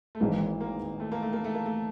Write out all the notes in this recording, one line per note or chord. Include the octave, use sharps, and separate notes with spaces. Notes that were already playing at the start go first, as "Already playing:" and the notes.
A3
G#1 G#2 E3 G#3 A#3
A#3
A3
A#3
A3
A#3
A3
A#3
A3